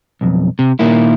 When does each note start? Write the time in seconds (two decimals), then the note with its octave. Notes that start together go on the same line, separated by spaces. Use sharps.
0.21 B1 F2
0.59 C3
0.79 A#2 D#3 A#3 E4